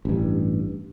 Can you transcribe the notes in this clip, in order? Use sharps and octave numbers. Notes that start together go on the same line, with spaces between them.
A1 G2